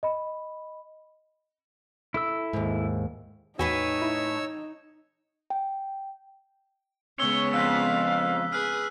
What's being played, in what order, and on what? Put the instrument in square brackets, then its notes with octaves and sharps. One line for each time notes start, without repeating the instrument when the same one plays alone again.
[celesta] D#5 B5
[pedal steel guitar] E4 A4 E6
[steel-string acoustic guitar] D#2 G#2
[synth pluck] E2 F#4 [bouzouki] A2 B4 G#5 [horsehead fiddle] D#4 [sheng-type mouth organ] C#5 E6
[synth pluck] E4
[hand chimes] G5
[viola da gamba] C#3 G#3 B3 [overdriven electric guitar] C#5 [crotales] E6 [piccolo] G7
[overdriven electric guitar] F2 [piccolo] F5 [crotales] E6 F#6 B6
[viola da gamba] G#4 B4 [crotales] F6 F#6